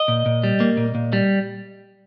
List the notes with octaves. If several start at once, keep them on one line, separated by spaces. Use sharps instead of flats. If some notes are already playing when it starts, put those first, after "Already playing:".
Already playing: D#5
A#2
A#2
G3
A#3
A#2
A#2
G3